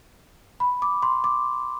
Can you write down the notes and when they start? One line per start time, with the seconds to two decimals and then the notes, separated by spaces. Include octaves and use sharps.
0.60 B5
0.82 D6
1.02 C6
1.24 D6